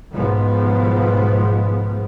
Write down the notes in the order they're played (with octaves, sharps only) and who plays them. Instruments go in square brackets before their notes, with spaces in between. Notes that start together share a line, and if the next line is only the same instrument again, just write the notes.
[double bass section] B1 G#2 D#3 F3 G#3 B3